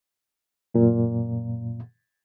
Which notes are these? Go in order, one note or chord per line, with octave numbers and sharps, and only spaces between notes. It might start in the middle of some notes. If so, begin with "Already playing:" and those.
F#2 A#2